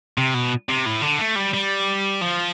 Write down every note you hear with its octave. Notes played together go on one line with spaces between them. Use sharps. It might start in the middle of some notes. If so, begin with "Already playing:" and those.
C3
B2
C3
A2
D3
A3
G3
G3
F3